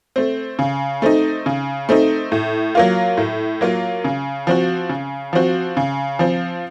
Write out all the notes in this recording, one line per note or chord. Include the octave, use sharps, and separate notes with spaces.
A3 C4
C#3
A3 C4 D#4
C#3
A3 C4 D#4
A2
F#3 A#3 F4
A2
F#3 A#3 F4
C#3
F3 C4 F#4
C#3
F3 C4 F#4
C#3
F3 C4